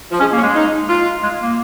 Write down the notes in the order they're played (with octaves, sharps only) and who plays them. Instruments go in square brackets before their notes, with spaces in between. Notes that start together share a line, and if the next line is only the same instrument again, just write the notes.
[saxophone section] F3
[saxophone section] G#3 [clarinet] C#4
[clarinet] A#3
[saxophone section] C#4
[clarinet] G#3
[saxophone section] D#4
F4
[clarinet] G#3
A#3